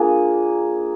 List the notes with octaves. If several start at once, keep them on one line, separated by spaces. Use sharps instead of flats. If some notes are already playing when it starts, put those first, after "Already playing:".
Already playing: A#3 D4 F4 G#4